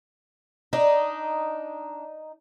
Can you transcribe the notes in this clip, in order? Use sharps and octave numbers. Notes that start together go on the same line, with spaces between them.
D4 D#4